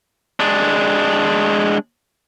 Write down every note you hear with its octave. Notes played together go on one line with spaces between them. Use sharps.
G#3 D4